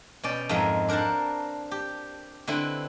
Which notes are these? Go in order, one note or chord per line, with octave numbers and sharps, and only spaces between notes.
B2 C#4 D5 G5
F2 G#2 G#3 A#4 E5
D4 A#4 C5 F#5 A5
G4
D3 C4 E4 B4